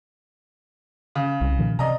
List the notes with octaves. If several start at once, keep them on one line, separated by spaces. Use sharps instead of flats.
C#3
C2
A#2 D#3 F3
C3 D5 D#5 A#5